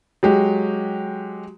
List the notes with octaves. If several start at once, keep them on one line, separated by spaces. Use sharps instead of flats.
F#3 G#3 G4